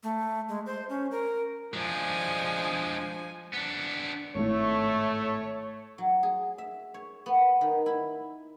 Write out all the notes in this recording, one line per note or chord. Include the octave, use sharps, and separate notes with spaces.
A3
G#3
C5
C#4
A#4
F3 G#3 D4 G#5
B3 D4
G#1 A2 A3 C#5
F#3
G#4
E5
C#5
B3
D#3
E4